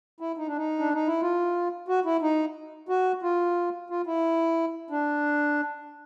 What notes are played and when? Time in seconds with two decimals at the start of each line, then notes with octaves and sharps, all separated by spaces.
0.20 E4
0.37 D#4
0.47 D4
0.56 D#4
0.79 D4
0.94 D#4
1.07 E4
1.21 F4
1.88 F#4
2.05 E4
2.22 D#4
2.89 F#4
3.22 F4
3.90 F4
4.07 E4
4.90 D4